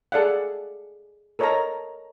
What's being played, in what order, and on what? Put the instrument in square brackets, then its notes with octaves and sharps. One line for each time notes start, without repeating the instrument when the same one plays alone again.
[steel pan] G#4 A4 D5 F5 F#5
A4 A#4 C#5 D#5 A5 A#5